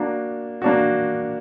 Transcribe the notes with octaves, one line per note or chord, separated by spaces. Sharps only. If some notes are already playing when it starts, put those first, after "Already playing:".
Already playing: A#3 D4 F#4
A#3 D4 F#4